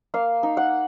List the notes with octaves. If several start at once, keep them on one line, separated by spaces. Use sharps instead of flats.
A#3 F5
D#4
F#5